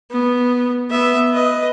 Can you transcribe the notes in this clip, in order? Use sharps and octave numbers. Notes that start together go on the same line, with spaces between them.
B3
B3 E5
B4 D#5